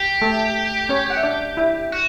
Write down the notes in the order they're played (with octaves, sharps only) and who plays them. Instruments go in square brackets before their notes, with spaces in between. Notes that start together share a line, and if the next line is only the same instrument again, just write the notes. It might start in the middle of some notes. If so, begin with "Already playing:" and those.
Already playing: [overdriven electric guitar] G4
[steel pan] A3 A4
C#4 C#5
F#5
E5
D4 D5
E4 E5
[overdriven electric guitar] F#4